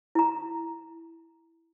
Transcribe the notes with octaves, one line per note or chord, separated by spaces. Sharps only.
E4 A#5